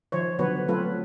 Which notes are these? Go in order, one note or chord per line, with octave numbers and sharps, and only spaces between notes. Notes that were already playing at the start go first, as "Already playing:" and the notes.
D#3 F3 C5 C#5
D3 F#3 B3 F#4 B4 C#5
F#3 A3 C4 F4 A4 B4